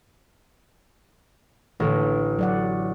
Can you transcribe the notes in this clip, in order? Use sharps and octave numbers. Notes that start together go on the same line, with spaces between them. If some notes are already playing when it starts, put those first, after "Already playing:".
A1 D3 A4 B4
F#3 D5 F#5